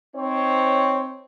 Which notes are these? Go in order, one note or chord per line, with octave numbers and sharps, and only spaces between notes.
C4 D#4 C5 C#5